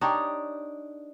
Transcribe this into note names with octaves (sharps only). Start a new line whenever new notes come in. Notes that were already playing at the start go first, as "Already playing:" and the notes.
D4 D#4 G4 C#5